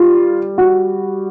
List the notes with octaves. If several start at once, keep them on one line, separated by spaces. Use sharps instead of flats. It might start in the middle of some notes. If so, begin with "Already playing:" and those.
Already playing: G3 F4
F#4